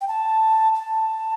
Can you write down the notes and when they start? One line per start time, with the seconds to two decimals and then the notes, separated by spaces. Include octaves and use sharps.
0.01 G5
0.08 A5
0.75 A5